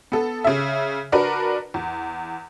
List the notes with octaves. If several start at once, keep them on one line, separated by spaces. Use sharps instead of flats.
B3 A4
C#3 E5
D4 F#4 A#4 B4
E2